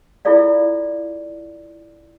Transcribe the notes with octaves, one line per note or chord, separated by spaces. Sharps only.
E4 F4 G#4 A4 D5 F5